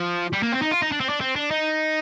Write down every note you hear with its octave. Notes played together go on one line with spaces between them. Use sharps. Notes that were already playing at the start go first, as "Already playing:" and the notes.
Already playing: F3
G3
A#3
C4
D#4
F4
D#4
D4
C4
D4
C4
D4
D#4